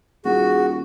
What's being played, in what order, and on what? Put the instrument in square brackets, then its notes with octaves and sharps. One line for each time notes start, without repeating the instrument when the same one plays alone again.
[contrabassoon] D#1 [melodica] F#4 [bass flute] G#4